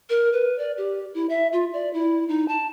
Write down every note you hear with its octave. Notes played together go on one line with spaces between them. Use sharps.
A#4
B4
D5
G4
E4
E5
F4
D5
E4
D#4
A5